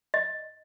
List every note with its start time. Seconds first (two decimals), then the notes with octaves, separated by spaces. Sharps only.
0.14 D#5